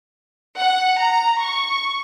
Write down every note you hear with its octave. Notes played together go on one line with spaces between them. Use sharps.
F#5
A#5
C#6